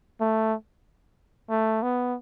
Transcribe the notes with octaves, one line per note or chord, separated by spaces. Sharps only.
A3
A3
B3